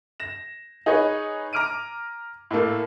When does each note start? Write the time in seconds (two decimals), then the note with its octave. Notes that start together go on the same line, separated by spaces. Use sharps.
0.20 A#6 E7
0.86 D#4 G#4 B4 C#5 D#5
1.53 A#5 D6 F6 D7 D#7
2.51 A2 A3 A#3 A4